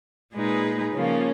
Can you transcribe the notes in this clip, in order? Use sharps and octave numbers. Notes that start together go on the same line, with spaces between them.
A#2 G#3 D#4 G#4 B4
C#3 F3 A#3 C#4 F4